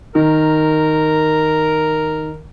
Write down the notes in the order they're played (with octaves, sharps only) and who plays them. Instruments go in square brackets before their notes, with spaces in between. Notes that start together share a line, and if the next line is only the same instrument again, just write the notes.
[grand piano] D#3 [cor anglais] A#4